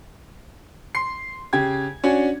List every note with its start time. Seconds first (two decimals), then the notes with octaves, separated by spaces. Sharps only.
0.95 C6 C7
1.53 C#3 G4 G#6
2.04 C#4 D4 F#4